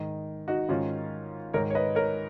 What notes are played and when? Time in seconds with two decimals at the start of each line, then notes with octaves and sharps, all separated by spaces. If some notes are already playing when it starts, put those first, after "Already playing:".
Already playing: G#2 D#3
0.48 D#4 F#4
0.69 G#2 D#3 C#4 F4
1.54 G#2 D#3 A#4 C#5
1.70 C#5
1.75 B4 D#5
1.95 A#4 C#5